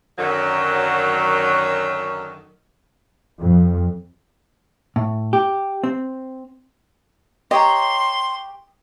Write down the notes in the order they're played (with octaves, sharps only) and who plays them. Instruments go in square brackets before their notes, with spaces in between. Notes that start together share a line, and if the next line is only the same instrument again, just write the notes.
[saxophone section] F#2 D3 D#3 F#3
[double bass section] F2
[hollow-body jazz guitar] A2
G4
C4
[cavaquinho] G4 C#5 A#5 [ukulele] D#5 [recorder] C6